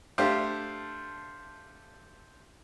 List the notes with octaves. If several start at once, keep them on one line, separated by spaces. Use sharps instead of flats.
A3 D4 G4 C5 F5